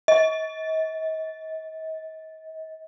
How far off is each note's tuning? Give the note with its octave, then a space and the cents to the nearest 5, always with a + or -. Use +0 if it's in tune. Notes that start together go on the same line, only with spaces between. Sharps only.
D#5 +40